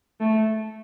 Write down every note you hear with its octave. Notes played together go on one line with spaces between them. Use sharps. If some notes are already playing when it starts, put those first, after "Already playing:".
A3